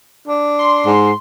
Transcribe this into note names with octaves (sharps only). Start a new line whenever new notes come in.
D4
C6
G#2